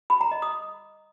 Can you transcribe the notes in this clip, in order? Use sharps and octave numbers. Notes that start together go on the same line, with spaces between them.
B5
A#5
D#5
D#6